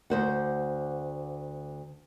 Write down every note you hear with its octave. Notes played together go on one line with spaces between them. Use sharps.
D2 C5 F#5